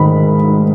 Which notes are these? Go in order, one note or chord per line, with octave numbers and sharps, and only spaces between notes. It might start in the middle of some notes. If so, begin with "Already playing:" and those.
Already playing: G#2 D#3 B5